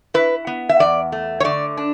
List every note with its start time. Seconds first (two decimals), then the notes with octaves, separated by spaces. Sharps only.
0.14 E4 B4
0.47 B3
0.69 E5
0.79 E2 D5
1.12 A3
1.40 C#5
1.44 D3 D5
1.77 D4